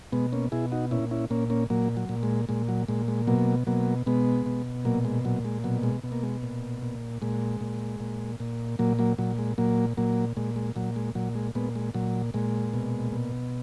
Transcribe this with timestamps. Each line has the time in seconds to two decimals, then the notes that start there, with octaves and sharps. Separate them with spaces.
0.12 B2 G#3 B3
0.32 A#3 C#4
0.52 B2 E4 G#4
0.72 D#4 F#4
0.91 A#2 C#4 E4
1.11 C#4 E4
1.30 A#2 A#3 C#4
1.50 A#3 C#4
1.70 A#2 F#3 A#3
1.97 F#3
2.09 A#2
2.23 G#3
2.49 A#2 G#3
2.69 F#3
2.88 A#2 G#3
3.08 G#3
3.27 B2 F#3 A#3
3.67 B2 F#3 A#3
4.07 B2 G#3 B3
4.46 B2
4.85 A#2 F#3 A#3
5.05 G#3
5.25 A#2 F#3
5.45 G#3
5.64 B2 F#3
5.83 G#3
6.03 B2
6.12 A#3
6.23 G#3
6.43 A#2
6.82 A#2
7.22 A#2 G#3
7.61 A#2
8.00 A#2
8.40 A#2
8.79 A#2 F#3 A#3
8.99 F#3 A#3
9.18 A#2 F#3
9.39 G#3
9.58 A#2 F#3 A#3
9.97 A#2 F#3 A#3
10.37 A#2 G#3
10.56 G#3
10.76 A#2 F#3
10.96 G#3
11.15 A#2 F#3
11.35 G#3
11.55 A#2 G#3 B3
11.75 G#3
11.94 A#2 F#3
12.34 A#2 G#3
12.73 B2
13.12 B2